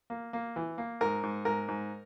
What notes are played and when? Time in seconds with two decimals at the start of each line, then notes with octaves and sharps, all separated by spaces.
0.10 A#3
0.33 A#3
0.56 E3
0.78 A#3
1.01 G#2 A#4
1.23 G#2
1.45 G#2 A#4
1.68 G#2